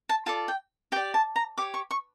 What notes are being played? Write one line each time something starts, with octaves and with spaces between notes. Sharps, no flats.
A5
F4 A4 D5 A5
G5
G4 D5 G5
A5
A#5
G4 C#5 D6
C#6
C#6